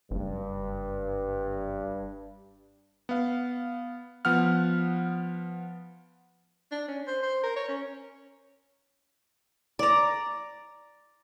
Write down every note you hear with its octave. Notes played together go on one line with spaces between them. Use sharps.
F#1 G2
B3 F5
F3 B3 F#5 F6
D4
C#4
C5
C5
A#4
C#5
C#4
D5 A#5